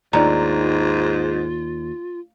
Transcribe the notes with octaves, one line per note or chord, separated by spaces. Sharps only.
D#2 G#2 D4 F4 D5 A#5